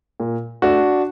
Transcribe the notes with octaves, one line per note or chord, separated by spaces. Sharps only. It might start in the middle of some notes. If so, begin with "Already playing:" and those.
A#2
A3 D4 F#4